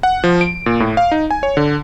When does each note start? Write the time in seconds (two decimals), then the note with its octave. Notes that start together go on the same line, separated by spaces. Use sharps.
0.03 F#5
0.24 F3
0.41 D7
0.66 A#2
0.80 A2
0.97 F5
1.12 D#4
1.31 G#5
1.43 C#5
1.57 D3